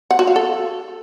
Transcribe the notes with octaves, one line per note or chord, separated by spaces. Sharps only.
F#5
F#4
F5
A4